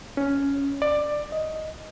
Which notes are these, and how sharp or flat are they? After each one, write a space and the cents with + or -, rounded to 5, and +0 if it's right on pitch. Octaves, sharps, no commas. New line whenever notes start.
C#4 +10
D5 +15
D#5 +10